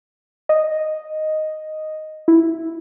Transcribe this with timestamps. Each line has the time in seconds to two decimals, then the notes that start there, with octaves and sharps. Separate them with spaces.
0.49 D#5
2.28 E4